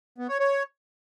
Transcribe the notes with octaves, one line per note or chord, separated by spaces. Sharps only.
B3
C#5
C#5